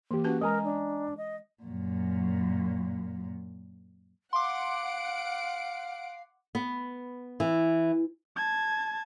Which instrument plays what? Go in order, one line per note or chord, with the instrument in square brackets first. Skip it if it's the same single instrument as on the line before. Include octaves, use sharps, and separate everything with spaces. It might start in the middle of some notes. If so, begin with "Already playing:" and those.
[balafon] E3 [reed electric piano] A#3 G4
[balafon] C#4 B4 A5 [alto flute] F#4
[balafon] G#3 [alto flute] A#4 [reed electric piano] D#5 G#5 A#5
[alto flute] D4
D#5
[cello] F#2 A#2
[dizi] F5 [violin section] F#5 D7 [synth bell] C6 D6
[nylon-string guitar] B3
E3
[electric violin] A5 G#6